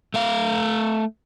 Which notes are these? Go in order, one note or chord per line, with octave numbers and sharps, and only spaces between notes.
A3 F5